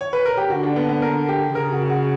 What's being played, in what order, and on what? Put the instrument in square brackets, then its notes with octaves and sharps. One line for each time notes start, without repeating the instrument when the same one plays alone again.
[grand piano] C#5
B4
A#4
G4
[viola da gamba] D3 [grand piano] F#4
[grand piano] D4
B3
B3
A#4
G4
[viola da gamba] C#3 [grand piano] A#4
[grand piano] F#4
F#4